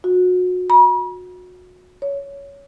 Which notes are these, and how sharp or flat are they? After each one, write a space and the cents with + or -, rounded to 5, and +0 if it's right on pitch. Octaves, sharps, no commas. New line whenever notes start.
F#4 -30
B5 -45
C#5 +15